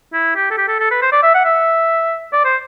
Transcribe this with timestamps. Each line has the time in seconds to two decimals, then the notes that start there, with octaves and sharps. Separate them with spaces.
0.13 E4
0.36 G4
0.51 A4
0.58 G4
0.68 A4
0.80 A4
0.91 B4
1.02 C5
1.12 D5
1.23 E5
1.34 F#5
1.45 E5
2.33 D5
2.45 C5